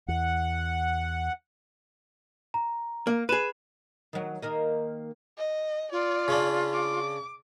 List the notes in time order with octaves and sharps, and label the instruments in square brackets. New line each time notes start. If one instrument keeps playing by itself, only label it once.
[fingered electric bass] E2 [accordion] F#5
[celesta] A#5
[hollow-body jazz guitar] A#3
[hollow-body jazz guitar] G#4 B4 [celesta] D#7 E7
[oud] D#3 F#3
D#3 A#3 D#5
[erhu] D#5
[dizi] F4 [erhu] D5
[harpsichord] C#3 C#4 D4
[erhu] D6